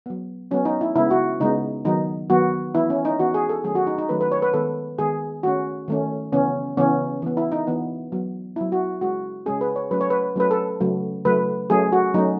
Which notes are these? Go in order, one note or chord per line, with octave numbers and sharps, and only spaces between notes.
F#3 B3
F#3 B3 C#4
D#4
E4
C#3 G#3 B3 E4
F#4
C#3 G#3 B3 D#4
D#3 F#3 B3 D#4
D#3 F#3 B3 F#4
E3 B3 E4
C#4
D#4
E3 B3 F#4
G#4
A4
D#3 F#3 A3 C#4 G#4
F#4
D#4
D#4
D#3 F#3 A3 C#4 B4
B4
C#5
B4
D#3 G#3 B3 A4
D#3 G#3 B3 G#4
D#3 A3 C#4 F#4
D#3 A3 C#4
C#3 E3 B3 C#4
C#3 E3 B3 C#4
E3 B3
E4
D#4
E3 B3
F#3 B3
F#3 B3 E4
F#4
C#3 G#3 C#4 F#4
C#3 G#3 C#4 G#4
B4
C#5
F#3 A3 C#4 B4
C#5
B4
F#3 A3 C#4 B4
A4
C#3 F#3 A3
C#3 F#3 A3 B4
F#3 A3 C#4 G#4
F#4
F#3 A3 C#4 D#4